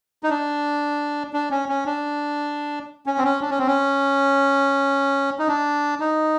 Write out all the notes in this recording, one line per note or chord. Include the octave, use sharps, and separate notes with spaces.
D#4
D4
D4
C#4
C#4
D4
C#4
C4
C#4
D4
C#4
C4
C#4
D#4
D4
D#4